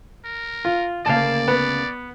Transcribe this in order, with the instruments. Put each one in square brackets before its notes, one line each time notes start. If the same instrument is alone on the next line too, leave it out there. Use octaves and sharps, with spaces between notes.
[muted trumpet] A#4
[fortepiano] F4
[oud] D2 C#3 A#3 [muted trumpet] D5 [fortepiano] F5 A5
[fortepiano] B3